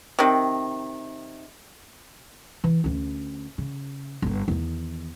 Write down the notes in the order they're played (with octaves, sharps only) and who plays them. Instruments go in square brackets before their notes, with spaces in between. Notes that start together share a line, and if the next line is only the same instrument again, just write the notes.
[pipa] C3 D#3
[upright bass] E3
D2 C#4
C#3
G1 G2
E2 D#3